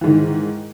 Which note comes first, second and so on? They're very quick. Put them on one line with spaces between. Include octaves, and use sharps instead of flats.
E3 G#2 D#3